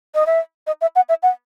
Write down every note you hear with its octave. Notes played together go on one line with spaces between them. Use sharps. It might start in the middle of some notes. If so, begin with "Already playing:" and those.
D#5
E5
D#5
E5
F#5
E5
F#5